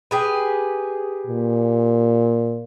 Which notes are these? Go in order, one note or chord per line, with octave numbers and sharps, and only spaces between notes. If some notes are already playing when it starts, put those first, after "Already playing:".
G4 G#4 B4
A#2